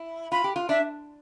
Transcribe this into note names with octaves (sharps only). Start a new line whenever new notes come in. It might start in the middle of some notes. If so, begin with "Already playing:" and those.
Already playing: E4
F4 B5
G4
F4
D4 E5